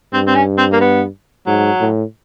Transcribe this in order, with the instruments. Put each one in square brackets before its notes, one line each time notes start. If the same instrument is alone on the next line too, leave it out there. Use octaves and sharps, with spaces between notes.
[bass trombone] G2 [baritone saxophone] C4
[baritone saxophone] C4
C#4
C4
A#3
B3
[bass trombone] G#2 [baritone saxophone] F#3
[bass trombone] A2